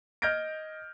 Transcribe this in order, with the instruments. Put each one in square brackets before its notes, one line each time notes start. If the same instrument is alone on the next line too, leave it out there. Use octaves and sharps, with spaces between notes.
[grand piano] D#5 F6 G6 G#6 A#6 D7